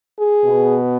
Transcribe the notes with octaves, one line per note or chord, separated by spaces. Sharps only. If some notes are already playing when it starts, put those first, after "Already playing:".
G#4
B2 B3